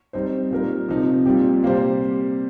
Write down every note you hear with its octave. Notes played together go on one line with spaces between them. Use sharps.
G3 C4 D#4 C5
A#2 G3 D#4 A#4
C3 F3 C4 D#4
A#2 G3 C4 G4
C3 G3 A#3 G4 C5